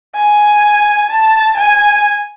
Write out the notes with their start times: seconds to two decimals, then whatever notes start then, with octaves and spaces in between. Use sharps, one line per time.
0.15 G#5
1.10 A5
1.58 G#5